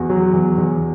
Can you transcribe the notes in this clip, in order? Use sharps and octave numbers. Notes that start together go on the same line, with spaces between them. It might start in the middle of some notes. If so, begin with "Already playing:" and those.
Already playing: E2 F#4
F#3
E2
E2